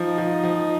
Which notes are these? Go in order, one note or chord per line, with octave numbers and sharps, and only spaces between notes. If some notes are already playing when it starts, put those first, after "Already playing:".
Already playing: F3 D#4
F3
F3